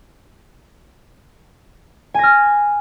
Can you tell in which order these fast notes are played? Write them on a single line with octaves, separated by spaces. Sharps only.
G#5 A#6 F6